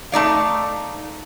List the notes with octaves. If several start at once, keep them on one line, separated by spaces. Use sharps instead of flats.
A3 D#4 D5 F5